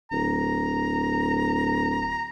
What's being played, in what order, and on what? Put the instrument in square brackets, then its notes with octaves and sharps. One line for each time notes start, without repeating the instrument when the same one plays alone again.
[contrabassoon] D1 [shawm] A#5